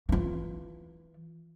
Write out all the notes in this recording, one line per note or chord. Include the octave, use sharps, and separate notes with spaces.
E3 F4